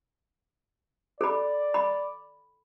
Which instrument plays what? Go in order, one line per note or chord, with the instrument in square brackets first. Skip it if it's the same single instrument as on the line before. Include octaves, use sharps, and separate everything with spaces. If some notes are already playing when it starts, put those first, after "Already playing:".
[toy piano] A4 B5 [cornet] D5
[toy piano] B5